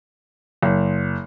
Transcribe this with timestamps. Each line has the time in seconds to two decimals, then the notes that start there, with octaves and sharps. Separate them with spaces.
0.63 F#1